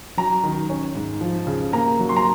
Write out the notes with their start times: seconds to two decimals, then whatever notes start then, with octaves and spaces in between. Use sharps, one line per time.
0.17 F#3 A#5
0.43 D#3
0.70 C#4
0.95 G#2
1.21 F3
1.47 C#3
1.73 A#3 A#5
1.99 F#3
2.09 C6
2.17 A#5